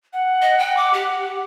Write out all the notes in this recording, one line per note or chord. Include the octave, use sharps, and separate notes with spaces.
F#5
D#5
G5
D6
G4